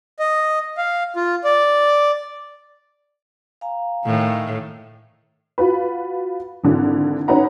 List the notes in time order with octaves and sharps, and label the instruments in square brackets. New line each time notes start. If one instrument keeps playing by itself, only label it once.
[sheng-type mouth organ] D#5
F5
F4
D5
[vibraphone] F5 G#5 A#5
[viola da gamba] A2 D#3
[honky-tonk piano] F4 F#4 B4
G#1 D3 E3
C#4 D#4 B4 F#5 A#5